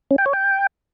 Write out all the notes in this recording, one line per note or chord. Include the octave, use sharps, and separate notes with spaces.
C#4
G5
C#5
G5